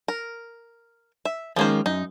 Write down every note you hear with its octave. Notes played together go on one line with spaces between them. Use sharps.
A#4
E5
D#3 F3 G#3 A#3 C#4 C5
F#2 D#4